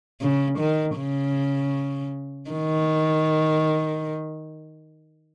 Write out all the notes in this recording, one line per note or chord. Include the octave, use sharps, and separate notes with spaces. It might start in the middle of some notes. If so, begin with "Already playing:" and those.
C#3
D#3
C#3
D#3